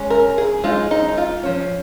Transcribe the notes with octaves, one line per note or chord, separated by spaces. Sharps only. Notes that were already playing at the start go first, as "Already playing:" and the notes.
Already playing: G#3 C#4
A#4
G#4
G#3 D#4 F4
D#4
D#4
F4
F3 C#4